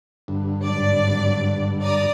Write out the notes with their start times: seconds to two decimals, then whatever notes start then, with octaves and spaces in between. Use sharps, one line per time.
0.28 G2 D3
0.63 G#1 F#3 D5
1.82 D5 A#5 D#6